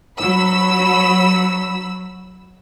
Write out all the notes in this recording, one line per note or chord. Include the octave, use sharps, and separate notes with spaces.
F#3 B5 E6